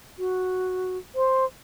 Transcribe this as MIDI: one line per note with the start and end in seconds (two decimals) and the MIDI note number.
0.19 0.97 66
1.15 1.45 72